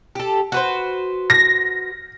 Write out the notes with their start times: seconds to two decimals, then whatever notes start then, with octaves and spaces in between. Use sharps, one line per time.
0.15 G4 A4
0.52 F#4 B4 C5
1.30 A#6